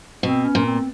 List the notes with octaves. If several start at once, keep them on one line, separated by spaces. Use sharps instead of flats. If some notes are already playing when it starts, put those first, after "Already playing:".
B2 C4
C#4
A#2
C4